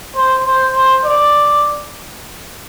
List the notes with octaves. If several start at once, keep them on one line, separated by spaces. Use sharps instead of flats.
C5
C5
C5
D5